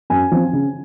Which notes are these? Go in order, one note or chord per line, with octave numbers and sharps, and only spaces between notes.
F#2 G#5
F3 C4
C#3